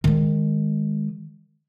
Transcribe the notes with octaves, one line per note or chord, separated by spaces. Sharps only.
D#3 G#3